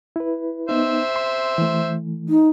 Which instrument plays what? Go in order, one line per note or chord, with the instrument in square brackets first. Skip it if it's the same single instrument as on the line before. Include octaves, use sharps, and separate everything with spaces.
[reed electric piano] E4 B4
[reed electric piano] B3 D#4 [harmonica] C5 E5
[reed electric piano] C6
E3 A3
[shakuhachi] D#4